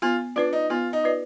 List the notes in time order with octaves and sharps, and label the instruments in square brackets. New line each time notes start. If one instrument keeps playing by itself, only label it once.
[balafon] B3 [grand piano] F4
[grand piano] D4 [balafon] F4 B4 D5
[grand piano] D#4
[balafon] B3 [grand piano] F4
[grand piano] D#4
[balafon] F4 B4 D5